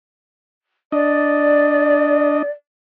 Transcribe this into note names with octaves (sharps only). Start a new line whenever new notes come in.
D4 D5 D#5